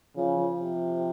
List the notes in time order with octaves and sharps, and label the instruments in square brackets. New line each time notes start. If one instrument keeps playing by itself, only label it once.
[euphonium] C#3 [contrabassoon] F3
[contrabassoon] F3
[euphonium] C3